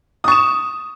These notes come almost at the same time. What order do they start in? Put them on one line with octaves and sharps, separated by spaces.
D#6 C#6 E7